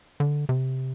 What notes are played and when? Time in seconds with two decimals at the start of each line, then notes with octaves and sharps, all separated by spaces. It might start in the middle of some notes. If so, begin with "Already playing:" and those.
0.20 D3
0.49 C3